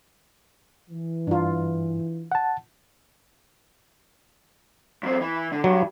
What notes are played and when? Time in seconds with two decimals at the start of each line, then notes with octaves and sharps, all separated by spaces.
0.90 E3
1.27 G2 D4 F4
2.32 F#5 A5
5.03 F#2 C4
5.21 E3
5.52 D3
5.64 G2 F#3